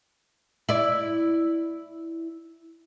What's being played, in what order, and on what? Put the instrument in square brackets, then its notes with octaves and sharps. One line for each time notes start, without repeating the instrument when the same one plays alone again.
[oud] E4 D5